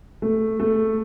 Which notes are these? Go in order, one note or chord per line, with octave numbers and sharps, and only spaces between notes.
A3
A3